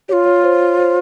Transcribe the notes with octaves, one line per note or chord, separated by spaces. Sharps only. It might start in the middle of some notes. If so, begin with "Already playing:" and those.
F4 G4 C#5
C#5
C5
C5